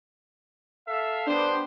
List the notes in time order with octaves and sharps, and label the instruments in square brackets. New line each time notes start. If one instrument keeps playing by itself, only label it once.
[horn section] A4 E5 F5
[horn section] B3 G4 C5 [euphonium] D4